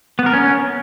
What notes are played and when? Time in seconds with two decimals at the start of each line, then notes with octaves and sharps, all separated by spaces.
0.19 B3
0.26 A#4
0.34 C#4